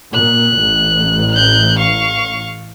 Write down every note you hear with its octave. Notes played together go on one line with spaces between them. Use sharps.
A#2 F#6
A1
F#6 G6
F5 C#6